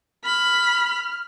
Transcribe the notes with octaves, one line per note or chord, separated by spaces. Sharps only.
B5 F6